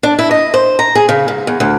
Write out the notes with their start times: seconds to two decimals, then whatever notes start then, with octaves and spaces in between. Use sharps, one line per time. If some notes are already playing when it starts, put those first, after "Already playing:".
0.03 D4
0.19 E4
0.31 D#5
0.54 C5
0.79 A#5
0.95 G#4
1.09 C#3
1.28 G#2
1.47 E2
1.60 D2